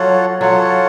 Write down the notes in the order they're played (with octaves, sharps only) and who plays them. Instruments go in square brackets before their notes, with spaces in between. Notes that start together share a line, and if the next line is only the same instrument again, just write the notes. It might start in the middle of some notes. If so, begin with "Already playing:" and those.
Already playing: [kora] F#3 [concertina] F4 A4 C#5 F#5
[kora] F#3 [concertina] F4 A4 C#5 F#5